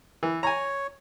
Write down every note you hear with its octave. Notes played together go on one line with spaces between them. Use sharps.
E3
C#5 G#5 A#5